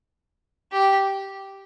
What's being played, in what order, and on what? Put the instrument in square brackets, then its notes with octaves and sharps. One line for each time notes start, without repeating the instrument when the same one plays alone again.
[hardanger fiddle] G4